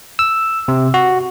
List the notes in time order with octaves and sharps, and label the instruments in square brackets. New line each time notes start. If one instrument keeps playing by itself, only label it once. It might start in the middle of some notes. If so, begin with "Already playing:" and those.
[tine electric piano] E6
C3
F#4